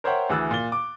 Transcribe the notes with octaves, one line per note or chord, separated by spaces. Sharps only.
A#4 C5 C#5 E5 F#5 G5
D2 E3 G#4 E6 F#6 A6
A#2 A6 G7
D6